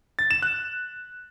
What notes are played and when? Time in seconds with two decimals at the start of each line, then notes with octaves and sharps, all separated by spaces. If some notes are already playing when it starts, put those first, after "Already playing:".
0.19 A6
0.31 E7
0.42 F#6